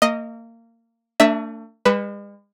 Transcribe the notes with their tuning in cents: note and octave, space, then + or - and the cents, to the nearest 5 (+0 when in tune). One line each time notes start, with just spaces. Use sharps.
A#3 -25 D#5 +0
A3 +40 D4 -15 E5 +0
G#3 -45 B4 +0